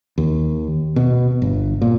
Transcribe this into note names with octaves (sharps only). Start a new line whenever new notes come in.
D#2
B2
G1
A#2